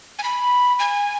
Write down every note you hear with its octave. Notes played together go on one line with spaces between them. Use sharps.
G#5
B5
G#5